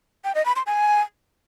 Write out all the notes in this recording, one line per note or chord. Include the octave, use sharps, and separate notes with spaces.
G5
D#5
B5
C6
G#5